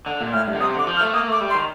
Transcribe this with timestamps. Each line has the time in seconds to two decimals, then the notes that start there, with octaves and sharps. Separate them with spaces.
0.06 D3
0.21 A#2
0.33 A2 F6
0.47 G2
0.55 D3
0.60 C3 D#6
0.74 D3 D6
0.87 F3
0.97 F6
1.01 A3
1.14 A#3 D#6
1.28 A3 D6
1.40 G3
1.50 C6
1.55 D#3